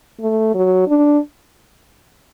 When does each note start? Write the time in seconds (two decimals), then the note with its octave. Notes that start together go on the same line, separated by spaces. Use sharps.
0.20 A3
0.54 F#3
0.88 D4